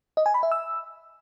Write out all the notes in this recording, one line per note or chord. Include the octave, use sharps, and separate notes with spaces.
D#5
G#5
B5
E5
E6